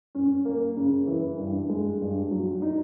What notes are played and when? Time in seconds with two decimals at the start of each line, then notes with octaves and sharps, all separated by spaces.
0.15 C#4
0.45 A#3
0.77 C#3
1.07 E3
1.38 G2
1.69 G#3
2.00 G2
2.31 F#3
2.62 D#4